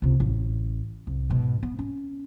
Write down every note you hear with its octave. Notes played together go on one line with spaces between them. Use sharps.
C#2 C3
A1
C2
G#2 B2
B3
C#4